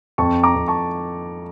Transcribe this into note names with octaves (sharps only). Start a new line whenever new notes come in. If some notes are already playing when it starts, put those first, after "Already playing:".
F2 A5 C#6
A#5 D6
F2
A5 C#6